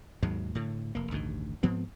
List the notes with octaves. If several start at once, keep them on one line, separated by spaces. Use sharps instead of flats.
D#2 G#2 F#3 G#3
A2 D3
F1 A#3
A1 D2 G2 D#3
G#2 F3 B3 C4